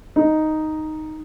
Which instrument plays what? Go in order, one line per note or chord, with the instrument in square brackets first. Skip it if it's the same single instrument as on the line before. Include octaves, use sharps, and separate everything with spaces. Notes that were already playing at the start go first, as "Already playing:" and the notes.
[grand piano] D#4